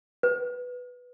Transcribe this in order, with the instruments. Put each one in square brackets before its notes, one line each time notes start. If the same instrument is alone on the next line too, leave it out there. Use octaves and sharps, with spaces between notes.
[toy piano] B4